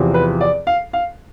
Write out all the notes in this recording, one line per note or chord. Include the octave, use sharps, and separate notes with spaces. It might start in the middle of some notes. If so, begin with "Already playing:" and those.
Already playing: E2 C3 F3 C4
B4
D5
F5
F5